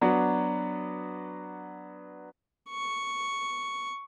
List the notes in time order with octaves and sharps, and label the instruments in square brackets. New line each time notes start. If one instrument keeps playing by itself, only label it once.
[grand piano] F#3 B3 D4 F#4
[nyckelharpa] C#6